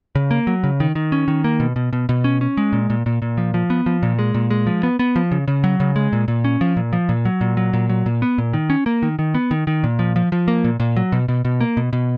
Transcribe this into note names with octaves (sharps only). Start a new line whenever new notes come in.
C#3
A#3
F#3
C#3
D#3
D#3
C#4
D#3
A#3
B2
B2
B2
B2
C#4
C#4
G#3
A#2
A#2
A#2
A#2
F3
F3
B3
F3
A#2
G#3
A#2
G#3
F3
B3
B3
F3
C#3
C#3
F#3
C#3
G#3
A#2
A#2
C#4
F3
A#2
F3
A#2
F#3
A#2
F#3
A#2
F#3
A#2
B3
A#2
D#3
C#4
A#3
D#3
D#3
B3
D#3
D#3
A#2
F3
F3
F3
A#3
A#2
A#2
F#3
B2
B2
B2
A#3
B2
B2